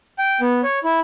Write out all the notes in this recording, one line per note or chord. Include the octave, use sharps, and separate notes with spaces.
G5
B3
C#5
E4